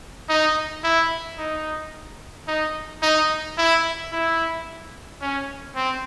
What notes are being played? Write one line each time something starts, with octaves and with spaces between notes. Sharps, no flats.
D#4
E4
D#4
D#4
D#4
E4
E4
C#4
C4